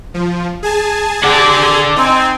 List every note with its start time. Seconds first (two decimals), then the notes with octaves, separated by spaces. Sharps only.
0.14 F3
0.63 G#4 G#5 A5
1.24 C4 D4 G4 F#5 D6
1.96 C4 D#4 G#5